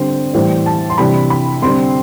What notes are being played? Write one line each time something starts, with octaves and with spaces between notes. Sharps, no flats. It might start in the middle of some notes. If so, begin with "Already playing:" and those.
Already playing: D3 G3 C4 C5
A2 E3 G3 C5
A5
C6
C3 E3 G3 D4 B5
B5
D3 G3 C4 C6